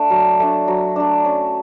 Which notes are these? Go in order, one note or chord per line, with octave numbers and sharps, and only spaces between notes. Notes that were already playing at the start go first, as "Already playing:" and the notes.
Already playing: A3 D4
F#3
A3 D4
F#3
A3 D4
C#4